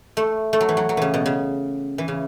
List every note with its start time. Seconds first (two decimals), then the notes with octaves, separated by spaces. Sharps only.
0.17 A3
0.53 A3
0.61 F#3
0.69 E3
0.77 F#3
0.89 F#3
0.97 C#3 E3
1.14 B2
1.26 C#3
1.98 E3
2.08 C#3